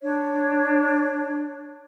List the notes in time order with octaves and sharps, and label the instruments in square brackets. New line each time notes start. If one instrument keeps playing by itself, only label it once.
[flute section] D4 C#5